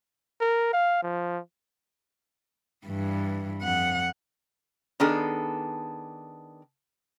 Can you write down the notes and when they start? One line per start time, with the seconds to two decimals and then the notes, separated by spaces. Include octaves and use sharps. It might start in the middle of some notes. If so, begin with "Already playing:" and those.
0.41 A#4
0.73 F5
1.03 F3
2.86 G2 E3
3.63 F2 F#5
5.00 D#3 B3 D4 G#4 A4